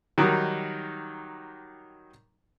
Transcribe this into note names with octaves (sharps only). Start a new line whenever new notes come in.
D#3 F#3 G3 D#4